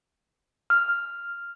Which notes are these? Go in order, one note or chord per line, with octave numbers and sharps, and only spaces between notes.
F6